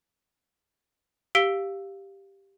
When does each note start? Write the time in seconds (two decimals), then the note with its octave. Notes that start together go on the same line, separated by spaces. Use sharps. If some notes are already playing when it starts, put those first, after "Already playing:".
1.35 G4 F5 E6 B6 D7 G7